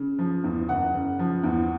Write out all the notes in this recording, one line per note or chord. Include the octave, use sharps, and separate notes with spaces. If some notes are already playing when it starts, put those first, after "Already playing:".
Already playing: C#3
F3
E2
F#1 F#5
C#3
F3
E2